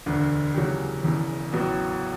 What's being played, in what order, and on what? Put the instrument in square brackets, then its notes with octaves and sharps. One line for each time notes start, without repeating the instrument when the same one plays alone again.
[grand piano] E1 D2 D3
E2 C#3 F#3 C#4 G4
E1 E2 C#3 E3
A1 A2 F#3 B3 F#4